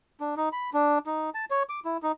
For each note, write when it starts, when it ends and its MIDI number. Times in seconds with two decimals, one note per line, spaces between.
0.20 0.35 62
0.37 0.49 63
0.53 0.70 83
0.73 0.98 62
1.06 1.30 63
1.34 1.45 81
1.51 1.63 73
1.69 1.80 86
1.85 1.97 64
2.03 2.12 63